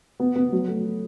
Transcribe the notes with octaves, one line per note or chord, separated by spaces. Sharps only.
B3
B3
F#3
A3